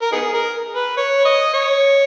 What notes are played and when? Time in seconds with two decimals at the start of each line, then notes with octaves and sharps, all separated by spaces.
0.02 A#4
0.12 B3 D#4 G#4
0.34 A#4
0.76 B4
0.97 C#5
1.25 D#5
1.54 C#5